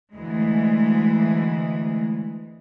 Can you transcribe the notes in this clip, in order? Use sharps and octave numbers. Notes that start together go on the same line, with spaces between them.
D2 E3 G#3